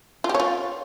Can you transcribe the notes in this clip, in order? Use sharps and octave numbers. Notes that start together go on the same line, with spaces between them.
F4
G4
C#5
F4